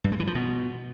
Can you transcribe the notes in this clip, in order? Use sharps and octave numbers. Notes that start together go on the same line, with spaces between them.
G2
G#3
E3
F3
B2